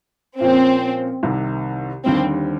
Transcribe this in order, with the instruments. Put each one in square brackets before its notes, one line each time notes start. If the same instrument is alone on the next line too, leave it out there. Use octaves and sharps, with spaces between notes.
[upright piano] A#2 F3 A#3 C#4 [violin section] C4
[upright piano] C2 C3 D#3
[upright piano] D#2 D3 G3 [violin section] C4